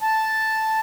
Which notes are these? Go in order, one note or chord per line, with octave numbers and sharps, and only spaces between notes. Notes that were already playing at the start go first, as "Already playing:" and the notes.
A5